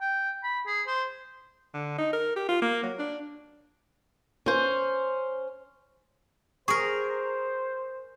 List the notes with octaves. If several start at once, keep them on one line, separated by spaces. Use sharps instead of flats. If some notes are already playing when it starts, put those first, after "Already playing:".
G5
B5
G#4
C5
D3
D#4
A#4
G4
F4
A#3
F#3
D4
C#4 C5
G#4 A#4 C5 C#6